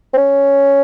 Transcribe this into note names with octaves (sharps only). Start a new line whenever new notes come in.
C4
C#4